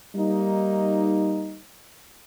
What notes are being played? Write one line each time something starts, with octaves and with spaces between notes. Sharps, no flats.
G3 A#3 D#4